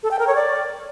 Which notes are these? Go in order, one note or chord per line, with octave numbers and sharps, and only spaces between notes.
A4
G5
A#4
C#5
D5